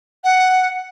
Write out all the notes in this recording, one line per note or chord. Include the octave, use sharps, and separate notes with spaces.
F#5